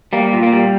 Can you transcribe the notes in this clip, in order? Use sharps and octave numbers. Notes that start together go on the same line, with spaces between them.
G3 A#3
A#2
A#3
G3